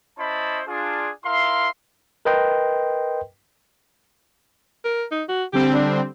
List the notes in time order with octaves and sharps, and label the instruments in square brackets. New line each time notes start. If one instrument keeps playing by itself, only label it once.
[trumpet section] C#4 E4 C5 D#5 A5 B5
D4 F4 G#4
E4 A#4 E5 F5 C6
[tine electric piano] A#4 B4 D#5 G5 C6
[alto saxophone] A#4
D#4
F#4
[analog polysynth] D3 G3 C4 [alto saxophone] G4
[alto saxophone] D4